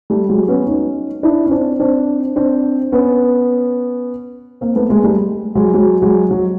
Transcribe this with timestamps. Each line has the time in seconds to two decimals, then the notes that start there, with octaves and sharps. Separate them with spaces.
0.10 G3 A3
0.29 F#3 G#3
0.48 B3 C#4
0.66 C#4 D#4
1.23 D4 E4
1.46 C#4
1.51 C4 D4
1.80 C4 D4
2.36 C4 D4
2.92 B3 C#4
4.61 A#3 C4
4.75 A3 B3
4.89 G#3 A#3
5.04 G3 A3
5.55 F#3 G#3
5.74 F#3 G#3
6.02 F#3 G#3
6.31 F#3